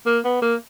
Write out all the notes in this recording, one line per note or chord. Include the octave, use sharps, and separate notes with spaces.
A#3
B3
A#3